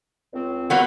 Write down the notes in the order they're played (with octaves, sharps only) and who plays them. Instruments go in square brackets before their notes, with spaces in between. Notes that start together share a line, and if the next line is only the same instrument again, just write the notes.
[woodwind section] C#2 C4
[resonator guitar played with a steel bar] F#3 A#3 B3